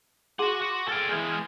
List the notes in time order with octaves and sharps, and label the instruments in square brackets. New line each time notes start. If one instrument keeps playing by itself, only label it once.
[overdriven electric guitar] F#4 F#5 [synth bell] G#4 C6 D6
[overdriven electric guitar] F#4
[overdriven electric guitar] A4 G5 [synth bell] F6 G#6
[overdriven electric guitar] E3 G#3 [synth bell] F6 G6 G#6